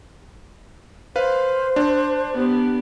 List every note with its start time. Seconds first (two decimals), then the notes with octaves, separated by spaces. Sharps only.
1.16 B4 C5 F5
1.76 D4
2.34 B3 G4